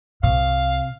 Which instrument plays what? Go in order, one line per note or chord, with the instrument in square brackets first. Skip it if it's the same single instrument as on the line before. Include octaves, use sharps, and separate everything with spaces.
[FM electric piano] C2 [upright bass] C3 [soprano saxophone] F5